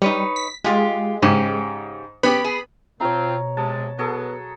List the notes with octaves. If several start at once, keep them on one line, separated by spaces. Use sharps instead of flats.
G3 D#4 B4 C#5
B6
G#3 F4 G4
G#2 C#3 C#4 G4
B3 C#4 G4 B5
G#4
B2 C4 F4 C#5 A#5
C3 G#3 A5
F#3 B3 G#4 A4